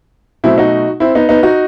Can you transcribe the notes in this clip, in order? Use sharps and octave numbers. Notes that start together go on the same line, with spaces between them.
B2 F#3 A3 C4 E4
D#4 F#4
C4 E4
B3 D#4
B3 D#4
D#4 F#4